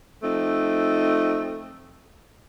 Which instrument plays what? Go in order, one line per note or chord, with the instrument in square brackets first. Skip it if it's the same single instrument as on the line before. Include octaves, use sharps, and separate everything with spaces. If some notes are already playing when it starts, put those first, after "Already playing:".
[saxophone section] F3 A3 C4 D#4